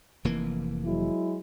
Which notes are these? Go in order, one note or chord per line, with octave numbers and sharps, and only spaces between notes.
F1 E3 A#3
F#3 G#3 E4